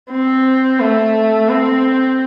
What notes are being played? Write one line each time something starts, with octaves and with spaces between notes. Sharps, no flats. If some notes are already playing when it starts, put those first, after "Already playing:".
C4
A3
C4